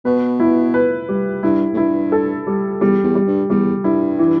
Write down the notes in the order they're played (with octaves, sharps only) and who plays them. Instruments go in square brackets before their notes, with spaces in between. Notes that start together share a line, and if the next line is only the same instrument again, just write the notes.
[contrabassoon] B2 [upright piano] B4
[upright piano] E4
B4
G3
[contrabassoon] G2 [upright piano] E4
[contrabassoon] A2
[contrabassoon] G2 [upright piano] E4
[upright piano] A4
G3
[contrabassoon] E2 [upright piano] G3
[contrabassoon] E2
[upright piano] G3
[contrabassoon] G2
[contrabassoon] E2 [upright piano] G3
[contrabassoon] G2 [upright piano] E4
[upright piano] E3